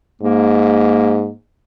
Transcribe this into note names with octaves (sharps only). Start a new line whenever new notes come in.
G#2 A#3